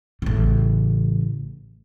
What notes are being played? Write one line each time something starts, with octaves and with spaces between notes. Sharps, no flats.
A1 C#3